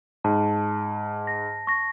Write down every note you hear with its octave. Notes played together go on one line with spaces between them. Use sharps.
G#2 A5
A#6
C#6 A#6